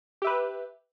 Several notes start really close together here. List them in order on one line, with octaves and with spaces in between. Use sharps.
G4 E5 B4